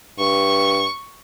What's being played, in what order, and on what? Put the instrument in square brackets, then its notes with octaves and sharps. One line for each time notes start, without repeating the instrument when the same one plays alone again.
[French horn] G2 [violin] C#6